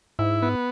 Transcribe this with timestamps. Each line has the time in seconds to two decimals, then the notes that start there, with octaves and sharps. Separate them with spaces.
0.19 G#2 E4
0.42 B3